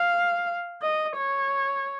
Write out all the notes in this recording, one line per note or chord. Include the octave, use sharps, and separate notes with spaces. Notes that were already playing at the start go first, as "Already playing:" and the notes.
Already playing: F5
D#5
C#5